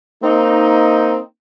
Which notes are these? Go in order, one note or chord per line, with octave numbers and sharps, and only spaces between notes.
A#3 C4 D#4